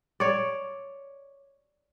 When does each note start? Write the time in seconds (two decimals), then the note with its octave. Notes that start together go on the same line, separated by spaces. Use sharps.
0.20 C#5 D5